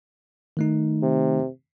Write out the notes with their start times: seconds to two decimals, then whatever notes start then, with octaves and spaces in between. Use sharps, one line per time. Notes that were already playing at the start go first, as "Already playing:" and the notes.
0.57 D#3 A3 D#4
1.03 C3